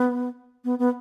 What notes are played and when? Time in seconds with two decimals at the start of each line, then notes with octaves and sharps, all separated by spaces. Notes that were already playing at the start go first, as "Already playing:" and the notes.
Already playing: B3
0.65 B3
0.79 B3